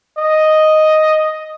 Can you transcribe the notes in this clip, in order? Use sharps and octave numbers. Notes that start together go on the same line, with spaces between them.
D#5